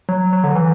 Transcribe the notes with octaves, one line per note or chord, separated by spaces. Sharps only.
F#3
F#3
D3
E3